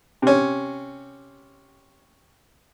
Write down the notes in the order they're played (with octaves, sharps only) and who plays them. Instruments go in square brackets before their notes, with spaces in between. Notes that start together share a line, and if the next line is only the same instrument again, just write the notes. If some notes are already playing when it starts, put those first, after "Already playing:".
[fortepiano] C3 C#4